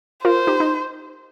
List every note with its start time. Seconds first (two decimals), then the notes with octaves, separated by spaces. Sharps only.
0.24 F4 A#4 C5
0.47 D#4 G4
0.60 D#4